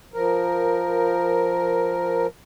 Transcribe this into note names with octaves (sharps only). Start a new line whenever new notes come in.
F3 A#4